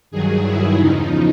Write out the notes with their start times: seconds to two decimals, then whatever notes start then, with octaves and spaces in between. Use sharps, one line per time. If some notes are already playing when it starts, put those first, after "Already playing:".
0.11 G2 D#3 F#3 G#4
0.44 E4
0.76 E2 C#3 F3 D#4